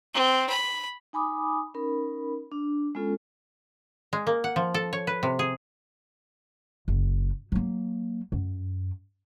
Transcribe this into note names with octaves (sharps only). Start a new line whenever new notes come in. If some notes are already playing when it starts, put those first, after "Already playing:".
C4
B5
D#4 G#5 B5 D6 D#6
C#4 D#4 A#4 B5
D4
G#3 B3 C#4 F4 A4
G#3
A#3
F#5
F3
A4
C#5
B4
C3
G#4
F#1
F#3 A#3
F#2